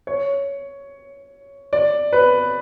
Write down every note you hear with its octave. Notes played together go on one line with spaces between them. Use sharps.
C#5
D5
B4